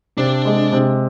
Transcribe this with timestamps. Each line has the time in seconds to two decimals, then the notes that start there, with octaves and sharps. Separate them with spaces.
0.18 C3 D4
0.45 G#3
0.72 C3